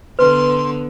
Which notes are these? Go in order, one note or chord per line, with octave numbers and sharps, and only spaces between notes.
D3 B3 B4 C6